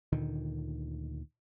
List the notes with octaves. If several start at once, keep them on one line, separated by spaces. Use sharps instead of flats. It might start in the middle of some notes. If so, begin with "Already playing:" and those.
D2 A#2 D3 D#3